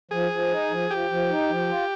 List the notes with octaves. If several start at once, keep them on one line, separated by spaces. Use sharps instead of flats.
F3 G#4
F3
D#4
F3
F3 G4
F3
D#4
F3
F4